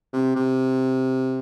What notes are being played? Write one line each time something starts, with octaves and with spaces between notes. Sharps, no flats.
C3
C3